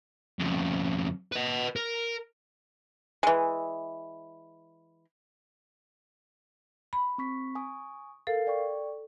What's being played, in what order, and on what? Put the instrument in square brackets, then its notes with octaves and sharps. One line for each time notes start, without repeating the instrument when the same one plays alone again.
[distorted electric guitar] F2 C#3
B4 D#5
A#4
[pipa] E3 G#3
[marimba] B5
[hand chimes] C4 C#6 B6
G#5 C#6 D#6
[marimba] A4 [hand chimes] A#4 F5 C7
[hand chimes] D5 G5 C#6